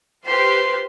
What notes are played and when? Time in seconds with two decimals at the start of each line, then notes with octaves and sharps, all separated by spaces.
0.24 F4 G4 B4 C5 C6